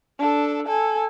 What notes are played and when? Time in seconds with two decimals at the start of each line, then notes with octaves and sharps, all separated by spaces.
0.18 D4 A4
0.67 A4 G#5